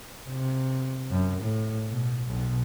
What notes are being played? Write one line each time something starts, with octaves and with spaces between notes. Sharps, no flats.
C3
F#2
A2
B2
B1 B2